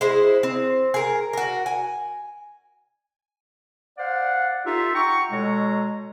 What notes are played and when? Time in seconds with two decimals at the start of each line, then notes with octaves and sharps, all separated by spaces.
0.01 G#3 E4 C5
0.43 C4
0.94 G#4 A#4
1.33 F#4 A#4
1.66 G#5
3.98 C5 D5 F5 F#5
4.66 D#4 F4 G4 A4 E5
4.94 F#5 G5 A#5 C#6
5.31 B2 G#3 A4 C#5 A#5